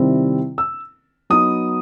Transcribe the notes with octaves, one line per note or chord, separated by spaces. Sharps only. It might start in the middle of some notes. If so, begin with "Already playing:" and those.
Already playing: C3 D#3 G3 C4 E4
E6
F#3 B3 D#4 D#6